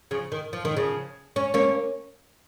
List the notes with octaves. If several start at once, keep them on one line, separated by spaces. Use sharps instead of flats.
C#3 F3
D#3
F3
D#3
C#3 F3
C#4
A#3 C#4